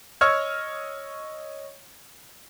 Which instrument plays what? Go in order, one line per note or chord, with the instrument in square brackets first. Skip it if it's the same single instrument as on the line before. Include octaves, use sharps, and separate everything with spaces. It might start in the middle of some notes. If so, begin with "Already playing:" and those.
[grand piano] C#5 D#5 C#6 E6 F6 G#6